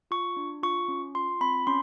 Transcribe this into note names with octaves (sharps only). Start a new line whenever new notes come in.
F4 C#6
D4
F4 C#6
C#4
F4 C6
C4 B5
C#4 C6